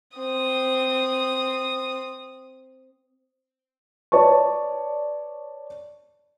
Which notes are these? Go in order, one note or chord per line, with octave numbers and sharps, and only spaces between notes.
C4 D#6
B4 C#5 D5 A5 C#6